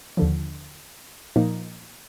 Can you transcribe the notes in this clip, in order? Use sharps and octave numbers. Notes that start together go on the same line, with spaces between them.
D#2 D3 F3
A#2 F3 A#3 D#4